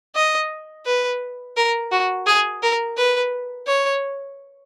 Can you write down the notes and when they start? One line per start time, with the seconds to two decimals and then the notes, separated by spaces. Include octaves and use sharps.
0.15 D#5
0.86 B4
1.57 A#4
1.92 F#4
2.26 G#4
2.63 A#4
2.97 B4
3.67 C#5